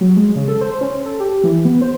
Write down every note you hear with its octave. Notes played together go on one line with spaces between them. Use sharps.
F#3
G#3
C#3
A4
C5
C#4
A4
G4
E3
B3
C5